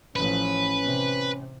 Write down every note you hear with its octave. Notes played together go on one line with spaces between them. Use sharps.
A1 F3 C#4 B4
C3